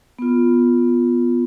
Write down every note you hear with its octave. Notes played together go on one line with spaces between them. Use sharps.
B3 F4